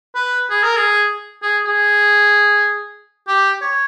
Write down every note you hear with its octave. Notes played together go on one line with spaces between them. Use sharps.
B4
G#4
A#4
G#4
G#4
G#4
G4
C#5